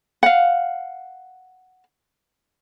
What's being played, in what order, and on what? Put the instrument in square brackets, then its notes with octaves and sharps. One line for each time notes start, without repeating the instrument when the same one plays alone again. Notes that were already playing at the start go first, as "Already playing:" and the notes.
[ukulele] F5 F#5